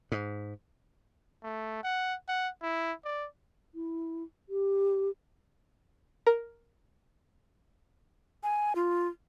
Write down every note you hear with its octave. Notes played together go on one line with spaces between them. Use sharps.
G#2
A3
F#5
F#5
E4
D5
E4
G4
A#4
G#5
F4